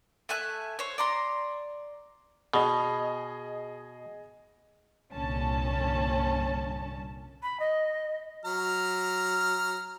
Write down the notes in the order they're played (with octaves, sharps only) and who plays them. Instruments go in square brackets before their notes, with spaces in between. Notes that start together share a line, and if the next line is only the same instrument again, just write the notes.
[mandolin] A3 E5 G#5 F#6
C5 C#5
D5 A#5 C6
[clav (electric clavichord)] B2 [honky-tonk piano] G#4 D#5
[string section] C2 G2 A#2 D3 C#4 A5
[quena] B5
D#5
[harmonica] F#3 A#5 F6